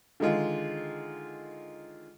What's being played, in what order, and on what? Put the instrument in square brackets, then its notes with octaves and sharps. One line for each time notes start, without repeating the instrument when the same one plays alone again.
[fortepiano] D3 D#3 G#3 F4